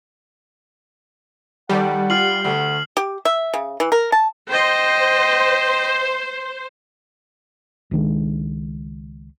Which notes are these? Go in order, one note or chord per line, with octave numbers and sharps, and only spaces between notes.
D#2 G3 A4 D5 F#5
F4 F6 C7 F#7
D2 A3 F#5
G4
E5
C#3
E3
A#4
A5
C5 D#5 G5
C#2 D#3 G#3